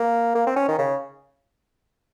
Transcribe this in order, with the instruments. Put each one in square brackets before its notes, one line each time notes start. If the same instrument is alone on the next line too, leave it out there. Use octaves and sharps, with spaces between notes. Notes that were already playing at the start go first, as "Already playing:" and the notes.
Already playing: [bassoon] A#3
A#3
C4
C#4
D#3
C#3